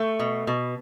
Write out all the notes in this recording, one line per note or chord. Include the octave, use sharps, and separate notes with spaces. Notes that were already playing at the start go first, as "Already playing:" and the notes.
Already playing: A3
B2
B2